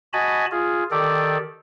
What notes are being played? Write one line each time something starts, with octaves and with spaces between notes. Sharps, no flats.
F#4 D#5 G#5 A5 B5
F4 G#4
D#3 G4 A4 D5